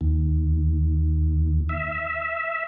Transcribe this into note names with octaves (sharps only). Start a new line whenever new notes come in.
D#2
E5